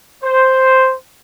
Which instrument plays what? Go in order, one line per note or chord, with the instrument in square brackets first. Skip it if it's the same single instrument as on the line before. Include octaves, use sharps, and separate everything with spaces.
[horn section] C5